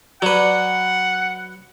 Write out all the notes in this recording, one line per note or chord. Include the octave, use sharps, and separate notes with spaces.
F#3 B4 D5 F#5